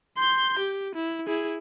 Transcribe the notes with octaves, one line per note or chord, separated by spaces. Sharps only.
C6 G6
G4
E4
E4 G#4